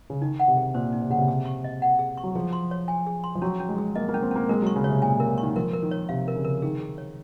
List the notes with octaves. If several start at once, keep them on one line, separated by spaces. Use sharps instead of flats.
C#3
D#3 D#4
F#5
C3
G#4
A#2 C5
D#4
C3
C#3 F#5
C3
G#4
C#6
D#5
F#5
G#4
C#6
F#3
F3 G#4
C6
C#5
G#5
G#4
C6
F3
F#3 C#4
C#4
G#3
G#4
A#3 D#5
A#3
C#4
C4
A#3 C#4
G#3 A#4
F#3 C#6
C#3
C#5
C3
A#2 G#5
C3
A#4
D#3 C#6
F3 A#4
A#4
D#3
C#5
C3 F5
A#4
C#3
A#4
D#3 G#4
G#4
C#5